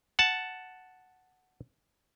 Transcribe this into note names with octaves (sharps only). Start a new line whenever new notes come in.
F#5 A5